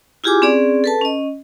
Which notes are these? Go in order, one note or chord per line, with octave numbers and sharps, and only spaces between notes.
E4 F4 G4 G#4 G#5 D6
C4 C#4 G#4 D5
A4 B4 A5
C#4 D#5